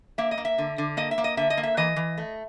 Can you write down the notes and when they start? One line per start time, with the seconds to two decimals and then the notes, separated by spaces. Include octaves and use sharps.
0.18 A#3 E5
0.31 D#5
0.38 A#3
0.45 E5
0.58 D3
0.78 D3
0.97 A#3 D#5
1.11 E5
1.18 A#3
1.24 D#5
1.37 D3 E5
1.50 D#5
1.57 A#3
1.63 E5
1.77 E3 D#5
1.96 E3
2.18 A3